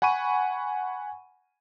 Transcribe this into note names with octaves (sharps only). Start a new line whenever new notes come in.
F#5 G#5 B5 C#6 D#7